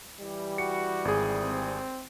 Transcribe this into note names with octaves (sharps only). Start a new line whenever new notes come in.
E3 G3 G4
F#4 C#7
G#1 G#4
C4